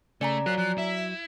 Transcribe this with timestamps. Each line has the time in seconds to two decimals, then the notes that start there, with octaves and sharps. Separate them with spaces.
0.21 C#3 A3 D5 G#5 A#5
0.46 F#3 F4 A#4 F#6
0.58 F3 F#6
0.78 E4 E5